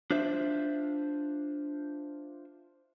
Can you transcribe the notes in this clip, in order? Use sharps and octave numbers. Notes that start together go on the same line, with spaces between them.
D4 F4 C5 E5